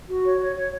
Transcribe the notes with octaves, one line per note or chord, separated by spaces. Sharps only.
F#4
C#5
C#5
C#5